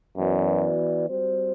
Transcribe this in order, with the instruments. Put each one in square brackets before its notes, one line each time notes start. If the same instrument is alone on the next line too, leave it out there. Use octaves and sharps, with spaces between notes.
[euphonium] F#2 [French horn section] E3 B3 F#4 B4 D5
[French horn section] G3 C4 F#4 C5